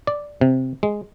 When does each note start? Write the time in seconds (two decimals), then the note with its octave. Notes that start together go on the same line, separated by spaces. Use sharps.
0.07 D5
0.41 C3
0.83 G#3